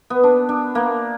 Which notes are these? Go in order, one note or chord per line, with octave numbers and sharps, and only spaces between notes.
B3
D4
D4
A#3